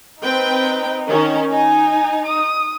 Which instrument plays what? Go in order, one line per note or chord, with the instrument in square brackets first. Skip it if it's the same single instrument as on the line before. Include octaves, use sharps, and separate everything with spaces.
[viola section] C4 B4 G5 [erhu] D#4
[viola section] D#3 C#4
[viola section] D#4 [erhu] G#5
[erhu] D#6